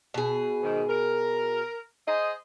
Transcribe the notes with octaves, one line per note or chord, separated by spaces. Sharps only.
B2 G#4
G#2 D#3
A#4
G#4 C5 D#5